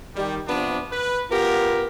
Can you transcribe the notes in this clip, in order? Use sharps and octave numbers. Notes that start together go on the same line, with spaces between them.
D#3 G3
C3 F3 B3 D4
B4
B3 F4 G4 A#4